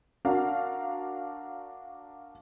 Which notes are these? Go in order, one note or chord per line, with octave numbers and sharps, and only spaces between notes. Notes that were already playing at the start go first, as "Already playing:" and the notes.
D4 F#4 A#4 F5